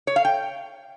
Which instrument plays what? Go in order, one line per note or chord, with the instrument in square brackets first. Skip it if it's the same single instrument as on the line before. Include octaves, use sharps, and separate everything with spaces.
[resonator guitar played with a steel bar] C#5
F5
G5